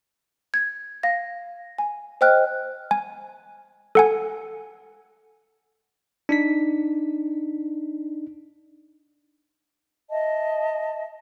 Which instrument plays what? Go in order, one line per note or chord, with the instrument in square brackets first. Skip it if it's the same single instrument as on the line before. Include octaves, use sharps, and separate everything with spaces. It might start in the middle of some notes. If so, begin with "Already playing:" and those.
[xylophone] G#6
F5 A#6
G#5
C5 D#5 G5 F6 F#6
[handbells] G#5
A4 F#5 G#5
[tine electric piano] D4 D#4 B6
[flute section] D#5 E5 A5